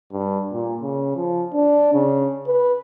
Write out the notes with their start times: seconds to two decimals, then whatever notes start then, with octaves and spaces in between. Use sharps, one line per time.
0.12 G2
0.53 A#2
0.82 C#3
1.16 F3
1.53 D4
1.93 C#3
2.47 B4